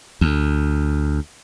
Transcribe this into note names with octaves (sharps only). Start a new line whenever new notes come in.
D2